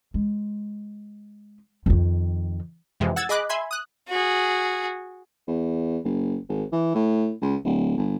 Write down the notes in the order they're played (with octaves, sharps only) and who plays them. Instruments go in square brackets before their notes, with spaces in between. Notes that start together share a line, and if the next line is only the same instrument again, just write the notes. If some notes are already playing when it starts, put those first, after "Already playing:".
[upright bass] G#3
F2 D#3
[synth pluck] F2 C3 E3 G#3
F#5 E6 G#6 A6
G#4 D#5 B5 D6 F#6
E5 G#5 B5 C6 G#6
D#6 F#6
[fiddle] F#4 G#4
[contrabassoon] E2
F#1
G#1
E3
A2
C#2
D1
G1